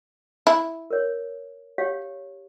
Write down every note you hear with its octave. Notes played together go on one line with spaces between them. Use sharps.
E4
A#4 C#5
G4 C#5 F5